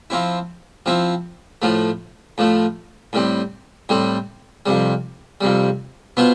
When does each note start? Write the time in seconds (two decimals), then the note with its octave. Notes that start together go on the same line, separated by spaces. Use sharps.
0.10 F3 C4 E4
0.86 F3 C4 E4
1.62 A2 F3 A3
2.38 A2 F3 A3
3.13 A2 G3 C4
3.89 A2 G3 C4
4.66 F2 C3 G3
5.41 F2 C3 G3
6.17 B2 B3 F4 C5